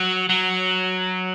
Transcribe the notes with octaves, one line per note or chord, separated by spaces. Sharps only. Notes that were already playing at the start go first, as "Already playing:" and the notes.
Already playing: F#3
F#3